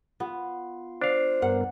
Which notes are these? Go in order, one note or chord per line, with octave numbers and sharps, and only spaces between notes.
B3 F4
D4 C5 F5
G2 B3 A#4 F#5